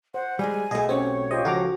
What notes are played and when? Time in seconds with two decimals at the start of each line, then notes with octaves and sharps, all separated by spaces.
0.14 C5 F#5
0.39 G3 G#3 G#5
0.71 B1 A3 G#4 D#5
0.89 C4 C#4 G4 C#5
1.31 F4 G4 C5 D#5
1.45 C#2 F3 F#4 A4 A#5 D6